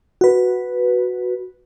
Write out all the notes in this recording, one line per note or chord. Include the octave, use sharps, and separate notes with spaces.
F#4 B4